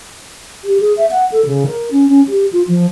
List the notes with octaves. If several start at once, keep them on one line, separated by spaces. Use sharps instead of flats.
G4
G#4
E5
F#5
A4
C#3
A#4
C#4
C#4
G4
F4
F3